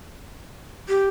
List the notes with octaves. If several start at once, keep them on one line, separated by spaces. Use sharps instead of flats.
G4